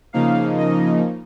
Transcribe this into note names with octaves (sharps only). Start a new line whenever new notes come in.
C#3 F3 A#3 D#4 F5
D#5